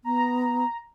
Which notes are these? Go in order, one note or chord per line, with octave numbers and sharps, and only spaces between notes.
B3 A#5